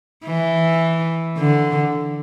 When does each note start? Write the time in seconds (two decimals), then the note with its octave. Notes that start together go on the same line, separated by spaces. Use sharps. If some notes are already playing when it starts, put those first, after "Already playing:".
0.25 E3
1.38 D3